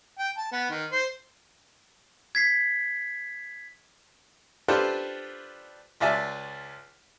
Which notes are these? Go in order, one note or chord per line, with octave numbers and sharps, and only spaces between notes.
G5
A5
B3
D#3
C5
G#6 B6 C7
D4 F4 G4 A4 B4 C5
C#2 F4 D5 E5 G#5 A5